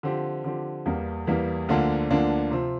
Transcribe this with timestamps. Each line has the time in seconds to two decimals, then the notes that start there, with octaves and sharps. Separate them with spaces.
0.03 D3 F3 C4 G4
0.44 D3 F3 C4 G4
0.86 E2 E3 G3 A#3
1.27 E2 E3 G3 A#3
1.69 D2 D3 F3 A#3 D4
2.10 D2 D3 F3 A#3 D4
2.51 C3 F3 C4 F4